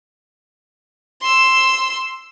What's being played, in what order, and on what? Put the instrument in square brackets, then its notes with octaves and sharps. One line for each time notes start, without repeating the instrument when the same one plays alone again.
[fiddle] C6 E6